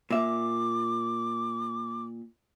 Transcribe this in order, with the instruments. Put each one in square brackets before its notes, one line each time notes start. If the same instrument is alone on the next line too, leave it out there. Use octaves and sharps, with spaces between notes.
[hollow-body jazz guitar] A#2 E5 [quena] D6